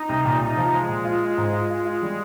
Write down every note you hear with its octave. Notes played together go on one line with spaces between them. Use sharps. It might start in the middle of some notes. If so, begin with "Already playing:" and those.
Already playing: D#4
C2
A#2
C2 D#4
F3
F3 G#3
A#2
F4
F4
G#2
F4
G#3 F4
F4
G3